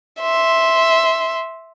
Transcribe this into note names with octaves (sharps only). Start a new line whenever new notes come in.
E5 C6